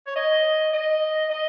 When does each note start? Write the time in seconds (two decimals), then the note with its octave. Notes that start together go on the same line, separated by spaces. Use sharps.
0.07 C#5
0.16 D#5
0.73 D#5
1.30 D#5